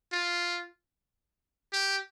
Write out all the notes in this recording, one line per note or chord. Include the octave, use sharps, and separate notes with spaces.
F4
G4